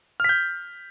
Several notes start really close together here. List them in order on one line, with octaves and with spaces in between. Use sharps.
F6 B6 G6